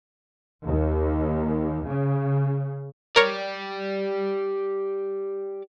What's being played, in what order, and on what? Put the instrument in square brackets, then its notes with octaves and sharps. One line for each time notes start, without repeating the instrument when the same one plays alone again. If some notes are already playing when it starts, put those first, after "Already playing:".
[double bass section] D#2
C#3
[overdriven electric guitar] G4 D5 [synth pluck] A#4 C#5